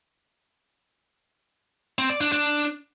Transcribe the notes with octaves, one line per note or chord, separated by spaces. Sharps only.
C4
D5
D4
D4